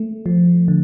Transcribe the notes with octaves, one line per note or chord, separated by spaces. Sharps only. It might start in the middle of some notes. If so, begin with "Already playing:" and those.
Already playing: A3
F3
D3